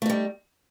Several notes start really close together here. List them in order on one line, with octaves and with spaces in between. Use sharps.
A3 D#4 G3